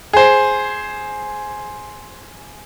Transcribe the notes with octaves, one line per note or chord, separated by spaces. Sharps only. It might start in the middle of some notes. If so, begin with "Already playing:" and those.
G#4 C5